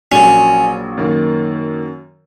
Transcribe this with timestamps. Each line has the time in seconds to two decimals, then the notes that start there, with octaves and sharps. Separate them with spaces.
0.11 A#1 A#2 F#3 C#4
0.97 F#2 D#3 A#3